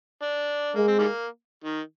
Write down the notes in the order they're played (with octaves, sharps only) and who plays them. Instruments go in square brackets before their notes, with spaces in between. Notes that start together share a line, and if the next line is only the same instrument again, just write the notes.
[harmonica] D4
[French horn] G#3 [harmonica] A#3
[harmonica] C4
D#3 G3 A#3
D#3